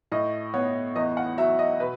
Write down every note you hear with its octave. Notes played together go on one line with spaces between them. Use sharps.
A2 D#5
B3 C#5
E2 D#5
F#5
F#3 E5
D#5
B2 B4